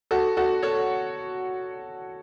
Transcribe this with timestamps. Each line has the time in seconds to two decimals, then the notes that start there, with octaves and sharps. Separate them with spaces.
0.11 F#4 A4
0.37 F#4 A4
0.63 A4 C#5